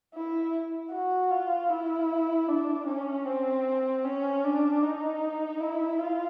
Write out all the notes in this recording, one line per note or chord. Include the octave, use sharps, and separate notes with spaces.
E4
F#4
F4
E4
D4
C#4
C4
C#4
D4
D#4
E4
F4